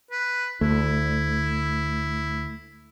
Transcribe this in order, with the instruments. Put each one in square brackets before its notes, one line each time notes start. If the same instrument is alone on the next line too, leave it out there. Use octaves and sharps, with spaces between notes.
[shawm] B4
[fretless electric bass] D2 [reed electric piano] A3 [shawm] E4